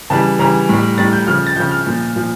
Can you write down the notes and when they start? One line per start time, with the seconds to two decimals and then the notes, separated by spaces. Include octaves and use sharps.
0.10 C#3 E3 G3 A5
0.39 C#3 E3 G3 A#5
0.69 A2 G3
0.98 A2 G3 A6
1.13 G6
1.27 C#3 F3 F6
1.47 A6
1.56 C#3 F3 G6
1.71 F6
1.87 A#2 F3
2.16 A#2 F3